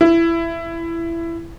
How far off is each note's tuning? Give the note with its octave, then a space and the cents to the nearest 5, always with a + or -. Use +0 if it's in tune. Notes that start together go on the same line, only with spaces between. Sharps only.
E4 +20